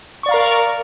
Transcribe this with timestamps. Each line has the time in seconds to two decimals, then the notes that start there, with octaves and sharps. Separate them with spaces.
0.23 C#6
0.26 D5
0.29 F5
0.31 A#5
0.34 A#4